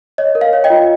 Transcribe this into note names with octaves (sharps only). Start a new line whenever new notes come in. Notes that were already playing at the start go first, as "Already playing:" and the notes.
C#5 D#5
A#4
F5
C#5
D#5 G5
F4